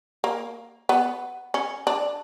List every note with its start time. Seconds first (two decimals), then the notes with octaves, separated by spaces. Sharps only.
0.24 A#3
0.89 B3
1.54 C#4
1.87 D4